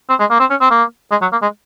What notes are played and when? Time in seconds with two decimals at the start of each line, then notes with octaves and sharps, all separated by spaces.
0.10 C4
0.20 G#3
0.30 A#3
0.40 C4
0.50 C#4
0.61 C4
0.71 A#3
1.11 G#3
1.22 F#3
1.32 A#3
1.42 G#3